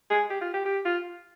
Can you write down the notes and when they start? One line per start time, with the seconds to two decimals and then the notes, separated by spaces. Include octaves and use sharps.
0.10 G#4
0.30 G4
0.41 F4
0.54 G4
0.66 G4
0.85 F4